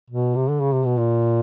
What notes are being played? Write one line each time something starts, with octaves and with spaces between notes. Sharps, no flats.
B2
C3
D3
C#3
C3
B2
A#2